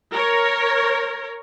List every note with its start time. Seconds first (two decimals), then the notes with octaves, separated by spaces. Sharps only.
0.12 A#4 C#5